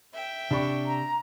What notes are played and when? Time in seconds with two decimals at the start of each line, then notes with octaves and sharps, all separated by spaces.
0.14 E5 G5
0.51 C3 D4 B5 C#6
0.86 A#5